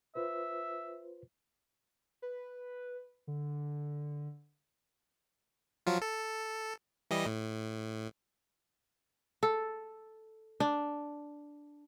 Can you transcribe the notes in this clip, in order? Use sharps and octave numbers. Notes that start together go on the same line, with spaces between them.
F4 B4 C5 E5
B4
D3
F3 F#3 F4
A4
E3 G3 D#5
A2
A4
D4